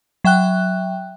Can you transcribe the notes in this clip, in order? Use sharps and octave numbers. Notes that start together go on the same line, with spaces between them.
F#3 E5 G5 F#6